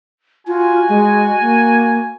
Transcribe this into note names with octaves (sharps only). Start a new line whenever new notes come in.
F4 F#4 G#5
G#3
A#3